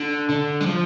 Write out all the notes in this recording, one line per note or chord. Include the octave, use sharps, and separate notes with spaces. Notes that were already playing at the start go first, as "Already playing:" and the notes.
Already playing: D3
D3
G3
F3